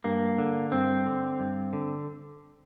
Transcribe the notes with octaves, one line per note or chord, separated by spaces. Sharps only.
G2 A#3
D3
G2 C4
D3
G2
D3